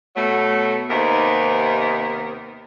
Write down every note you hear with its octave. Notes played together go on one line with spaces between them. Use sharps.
B2 F#3 A3
D#2 C3 B3 D#4 A#4